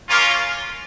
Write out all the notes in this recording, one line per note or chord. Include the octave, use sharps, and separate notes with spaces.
A#3 C#4 F4